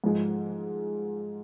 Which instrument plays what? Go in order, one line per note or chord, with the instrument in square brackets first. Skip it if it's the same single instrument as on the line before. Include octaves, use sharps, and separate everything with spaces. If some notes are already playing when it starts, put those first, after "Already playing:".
[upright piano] G#2 F3 G#3